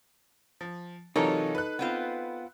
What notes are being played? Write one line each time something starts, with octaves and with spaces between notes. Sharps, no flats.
F3
C3 E3 F#3 D#4 F4 A4 A#4 C#5
B4 F#6
B3 C4 F4